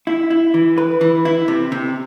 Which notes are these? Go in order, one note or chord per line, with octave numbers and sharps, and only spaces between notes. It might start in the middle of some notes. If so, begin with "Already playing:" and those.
E4
E4
E3
B4
E3
E4
C3
C3